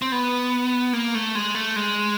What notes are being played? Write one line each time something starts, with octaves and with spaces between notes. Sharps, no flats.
C4
B3
A#3
A3
G#3
A3
G#3